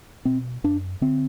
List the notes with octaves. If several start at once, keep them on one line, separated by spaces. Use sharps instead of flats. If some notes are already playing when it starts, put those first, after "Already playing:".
B2 C4
F#2 D4
D3 C4